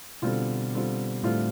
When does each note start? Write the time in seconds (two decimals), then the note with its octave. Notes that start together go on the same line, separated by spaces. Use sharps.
0.22 B2 D3 G3 B3 C4 F4
0.73 D3 G3 C4 F4
1.23 A2 D3 G3 A3 C4 F4